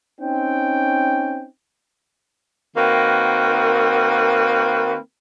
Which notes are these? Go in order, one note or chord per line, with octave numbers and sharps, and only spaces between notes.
C4 C#4 D#4 G5
D#3 A#3 C4 F#4 B4